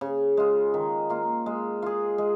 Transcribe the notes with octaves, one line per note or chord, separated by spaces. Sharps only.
C#3
G#3 F4
D#3
A#3 F4
G#3
F4 G#4
G#3